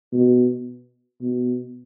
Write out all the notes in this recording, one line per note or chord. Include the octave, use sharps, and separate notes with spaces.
B2
B2